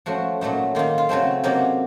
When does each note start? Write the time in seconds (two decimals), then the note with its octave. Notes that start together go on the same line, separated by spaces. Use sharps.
0.06 F3 A3 C#4 F#4
0.41 A#2 F#3 A3 D#4
0.75 D#3 A#3 D#4 F4
0.98 F4
1.09 C#3 F#3 A3 C4
1.44 C3 F#3 A#3 D#4